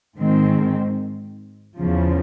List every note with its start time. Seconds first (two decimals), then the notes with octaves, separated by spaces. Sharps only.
0.17 G#2 D#3 G#3 C4
1.78 E2 C#3 F3